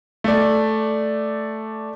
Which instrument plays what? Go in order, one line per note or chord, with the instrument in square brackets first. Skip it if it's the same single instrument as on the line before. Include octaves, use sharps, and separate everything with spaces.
[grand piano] A3 D5